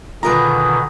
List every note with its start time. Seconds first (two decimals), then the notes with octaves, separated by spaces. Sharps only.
0.23 B2 D3 D#3 F4 G#4 A#4 B4 A#5